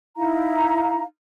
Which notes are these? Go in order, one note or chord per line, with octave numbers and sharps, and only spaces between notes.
D#4 E4 F5 A#5